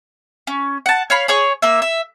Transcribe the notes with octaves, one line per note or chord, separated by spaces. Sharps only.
C#4
F#5 A5
C#5 F5 B5
G#4 C#5 C#6
A#3 E5
E5